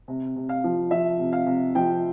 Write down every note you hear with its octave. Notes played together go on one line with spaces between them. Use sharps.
C3
C3
F5
F3
F3 E5
C3
F5
C3
F3 G5